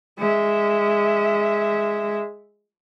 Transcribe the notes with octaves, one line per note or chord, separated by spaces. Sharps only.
G#3 E5